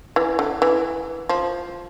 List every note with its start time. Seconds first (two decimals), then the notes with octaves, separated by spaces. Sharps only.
0.16 E3
0.39 D3
0.62 E3
1.29 F3